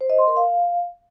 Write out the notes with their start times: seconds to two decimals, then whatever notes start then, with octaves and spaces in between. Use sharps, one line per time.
0.01 C5
0.10 D#5
0.19 C6
0.27 A#4
0.36 F5